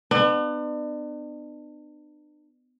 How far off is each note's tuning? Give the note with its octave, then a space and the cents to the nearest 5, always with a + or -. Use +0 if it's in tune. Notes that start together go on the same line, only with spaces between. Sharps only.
B3 +25 D4 +40